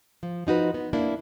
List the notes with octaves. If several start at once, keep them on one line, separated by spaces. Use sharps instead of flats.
F3
F3 D#4 F#4 B4
B3
A#3 D4 E4